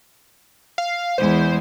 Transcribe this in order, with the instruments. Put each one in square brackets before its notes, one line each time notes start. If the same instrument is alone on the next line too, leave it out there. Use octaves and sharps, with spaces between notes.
[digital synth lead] F5
[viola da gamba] E2 G#3 [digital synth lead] C5